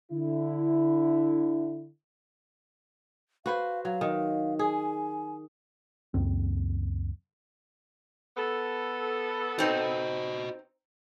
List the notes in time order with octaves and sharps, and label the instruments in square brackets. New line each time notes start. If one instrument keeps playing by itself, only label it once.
[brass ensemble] D3 E4
[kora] F#4 B4 C5 [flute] F5
[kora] F#3 [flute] F5
[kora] D#3
[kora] G#4 [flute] G#5
[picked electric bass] C#2 F#2 C4
[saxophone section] B3 A4
[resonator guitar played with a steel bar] C4 D#4 [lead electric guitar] F#4 D#5